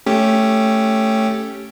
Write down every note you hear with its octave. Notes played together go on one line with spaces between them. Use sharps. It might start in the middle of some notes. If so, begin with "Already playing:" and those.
A3 C#4 G4